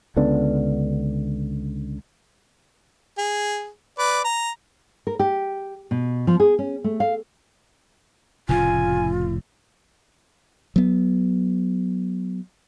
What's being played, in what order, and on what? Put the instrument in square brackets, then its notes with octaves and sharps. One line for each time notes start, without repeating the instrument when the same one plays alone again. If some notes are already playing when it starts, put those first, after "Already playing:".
[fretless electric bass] C#2 D3 B3 D4
[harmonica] G#4
B4 D5
A#5
[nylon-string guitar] A#4
G4
B2
F3
G#4
C#4
A3
F5
[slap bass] F1 A2 C#3 [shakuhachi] F4 [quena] G#5
[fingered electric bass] F#3 B3